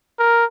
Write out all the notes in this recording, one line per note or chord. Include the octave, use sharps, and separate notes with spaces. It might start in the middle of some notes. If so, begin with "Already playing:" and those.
A#4